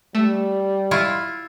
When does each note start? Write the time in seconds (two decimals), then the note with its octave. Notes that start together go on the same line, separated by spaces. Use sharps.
0.15 G3 A3 A4
0.91 E4 F4 C#6